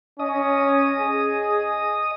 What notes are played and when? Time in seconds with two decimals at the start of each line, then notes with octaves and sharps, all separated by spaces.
0.19 C#4 D#5 D#6
1.00 G#4